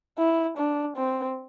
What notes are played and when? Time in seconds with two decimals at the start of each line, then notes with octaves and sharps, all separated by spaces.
0.19 E4
0.57 D4
0.97 C4